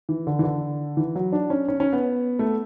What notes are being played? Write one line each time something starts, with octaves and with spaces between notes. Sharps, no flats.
E3
D3
E3
D3
E3
F#3
D4
C#4
C#4
C#4
B3
A3